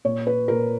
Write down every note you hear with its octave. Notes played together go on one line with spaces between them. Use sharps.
A#2 C#5
B4
A#2 A#4